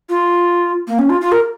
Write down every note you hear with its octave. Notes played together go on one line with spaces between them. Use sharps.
F4
A#3
C#4
F4
F4
A#4